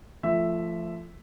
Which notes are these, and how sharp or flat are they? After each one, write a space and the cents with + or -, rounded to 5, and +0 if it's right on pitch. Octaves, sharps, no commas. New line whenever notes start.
F3 -25 A3 +5 E5 +0